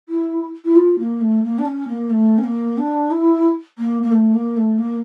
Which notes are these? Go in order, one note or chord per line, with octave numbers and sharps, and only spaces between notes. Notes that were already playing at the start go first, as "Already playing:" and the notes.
E4
E4
F4
A#3
A3
A#3
D4
C#4
A#3
A3
C#4
A#3
D4
E4
A#3
A#3
A3
A#3
A3
A#3